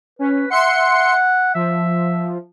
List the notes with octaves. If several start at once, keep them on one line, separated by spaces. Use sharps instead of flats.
C#4 B4
E5 F#5 C6 C#7
F3 E5